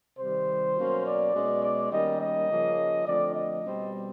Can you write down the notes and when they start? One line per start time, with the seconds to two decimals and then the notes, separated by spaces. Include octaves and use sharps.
0.19 C3 D#3 G3 C5
0.78 B2 F#3 A#3 C#4
1.05 D5
1.35 B2 G#3 C#4
1.63 D5
1.92 D#3 G3 A#3 C#4 D#5
2.20 D#5
2.49 C#3 F3 A#3 C#4
3.06 D3 F3 A3 C4 D5
3.35 D#5
3.64 B2 G3 C4